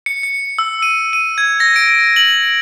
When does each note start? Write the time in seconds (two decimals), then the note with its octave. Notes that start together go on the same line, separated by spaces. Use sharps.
0.06 C#7
0.23 C#7
0.58 E6
0.82 D#7
1.13 D#7
1.38 G#6
1.60 A#6
1.76 D7
2.16 F#7